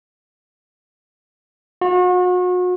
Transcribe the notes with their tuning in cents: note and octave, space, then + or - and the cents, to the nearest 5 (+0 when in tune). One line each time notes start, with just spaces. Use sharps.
F#4 -40